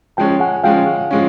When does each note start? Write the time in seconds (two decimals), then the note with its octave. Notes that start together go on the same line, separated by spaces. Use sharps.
0.17 F3 G#3 C#4 G5 A5
0.40 F#5 G#5
0.64 F3 G#3 C#4 F5 G5
1.11 F3 G#3 C#4